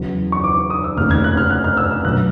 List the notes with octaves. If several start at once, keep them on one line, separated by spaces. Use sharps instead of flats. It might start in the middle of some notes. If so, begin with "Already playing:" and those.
Already playing: E2 C#3 F#3
C#6
D6
D#6
E6
F1 D#2 C#3 F6
G#6
F#6
F6
F#6
F6
E6
F6
B1 B2 F#3 F#6